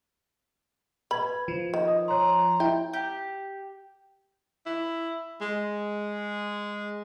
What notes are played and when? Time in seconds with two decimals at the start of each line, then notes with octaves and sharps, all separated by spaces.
1.11 B4 B5 G#6
1.48 F3
1.74 D#3
1.88 D#6
2.08 C#5 A#5 C6
2.60 E4 G5
2.93 G4
4.66 E4
5.41 G#3